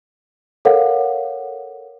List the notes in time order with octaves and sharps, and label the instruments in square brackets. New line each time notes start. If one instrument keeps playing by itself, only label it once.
[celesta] A4 A#4 C#5 F5 F#5